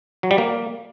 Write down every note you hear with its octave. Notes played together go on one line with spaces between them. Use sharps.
F#3
G3
A#3